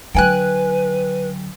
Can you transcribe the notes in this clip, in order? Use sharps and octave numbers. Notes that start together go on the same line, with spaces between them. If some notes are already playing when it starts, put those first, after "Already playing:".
D3 F#3 B4 G5 G#5 F#6